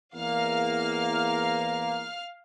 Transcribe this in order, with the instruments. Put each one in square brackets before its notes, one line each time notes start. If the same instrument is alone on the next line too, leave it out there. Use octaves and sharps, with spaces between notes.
[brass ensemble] E2 A#3 [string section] F5 F6